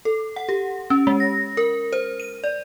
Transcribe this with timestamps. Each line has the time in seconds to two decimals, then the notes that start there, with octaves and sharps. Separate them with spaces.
0.05 A4
0.36 F#5
0.49 G4
0.90 C#4
1.07 G#3
1.20 A#6
1.57 A#4
1.93 C5
2.20 D#7
2.44 D5